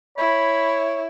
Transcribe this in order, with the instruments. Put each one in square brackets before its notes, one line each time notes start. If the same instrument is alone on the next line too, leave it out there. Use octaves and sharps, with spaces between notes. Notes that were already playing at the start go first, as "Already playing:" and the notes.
[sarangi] E4 [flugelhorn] C#5 [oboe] B5